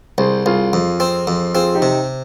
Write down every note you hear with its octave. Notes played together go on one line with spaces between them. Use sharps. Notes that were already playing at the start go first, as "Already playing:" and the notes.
C2 G#4 C5
C2 F4 G#4
F2
C4
F2
C4 F4 G#4
D#4 G4
C3